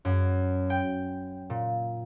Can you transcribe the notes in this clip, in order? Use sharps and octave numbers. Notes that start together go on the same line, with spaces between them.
F#2
G5
A#2